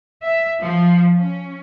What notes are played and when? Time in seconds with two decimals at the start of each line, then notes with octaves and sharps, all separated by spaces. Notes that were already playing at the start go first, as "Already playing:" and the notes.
0.24 E5
0.61 F3
1.18 C#4